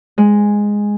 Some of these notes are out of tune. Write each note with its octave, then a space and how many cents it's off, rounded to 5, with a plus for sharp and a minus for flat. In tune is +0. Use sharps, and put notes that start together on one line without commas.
G#3 -5